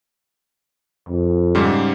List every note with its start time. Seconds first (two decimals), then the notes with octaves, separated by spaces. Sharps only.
1.09 F2
1.55 G#2 C#3 G3